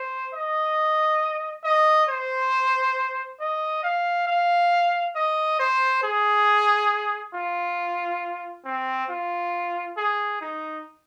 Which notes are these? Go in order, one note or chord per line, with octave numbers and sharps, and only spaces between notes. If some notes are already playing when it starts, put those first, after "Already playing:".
Already playing: C5
D#5
D#5
C5
D#5
F5
F5
D#5
C5
G#4
F4
C4
F4
G#4
D#4